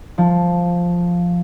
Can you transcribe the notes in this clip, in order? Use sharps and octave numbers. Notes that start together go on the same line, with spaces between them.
F3